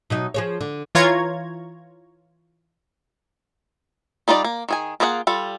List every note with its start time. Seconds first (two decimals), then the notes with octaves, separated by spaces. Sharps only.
0.10 B2 F#3 D#4
0.34 F3 G#4 C#5
0.61 D3
0.95 E3 F4 C#5 A#5 G#6
4.28 G3 D#4 F4 F#4 D5
4.44 A#3
4.69 D#3 G#4 G#5
5.00 A#3 F4 G#4 D#5 F#5
5.27 G3 F4 A4